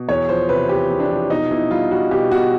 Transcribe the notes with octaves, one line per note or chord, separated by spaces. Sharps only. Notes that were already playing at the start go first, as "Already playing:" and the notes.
Already playing: B2
E2 C#5
F3 C5
C3 B4
E2 G4
E2
D4
F3
B2 D#4
B2 E4
G3 F4
G3 F#4
B2 G4
B2 F#4